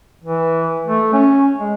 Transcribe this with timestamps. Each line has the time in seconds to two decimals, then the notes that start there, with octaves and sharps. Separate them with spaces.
0.24 E3
0.87 A3
1.13 C#4
1.58 G#3